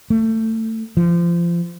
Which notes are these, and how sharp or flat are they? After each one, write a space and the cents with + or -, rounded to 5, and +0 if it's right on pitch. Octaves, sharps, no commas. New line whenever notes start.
A3 +25
F3 -25